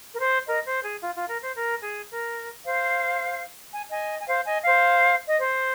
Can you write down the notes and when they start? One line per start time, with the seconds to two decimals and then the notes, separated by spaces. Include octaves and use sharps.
0.15 A#4
0.20 C5
0.47 A#4 D#5
0.66 C5
0.83 G#4
1.01 F4
1.16 F4
1.28 A#4
1.43 C5
1.56 A#4
1.83 G#4
2.11 A#4
2.65 C5 F5
3.74 G#5
3.90 D#5 G#5
4.19 G#5
4.28 C5 F5
4.46 D#5 G#5
4.65 C5 F5
5.27 D#5
5.38 C5